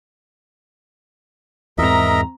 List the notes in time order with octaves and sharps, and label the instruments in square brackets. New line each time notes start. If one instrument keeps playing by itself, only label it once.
[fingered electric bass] E2 G#2 [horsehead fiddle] C4 A#5 [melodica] A#4 D#5 E5